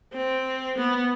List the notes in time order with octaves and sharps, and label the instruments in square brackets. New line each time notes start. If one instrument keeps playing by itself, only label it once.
[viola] C4
B3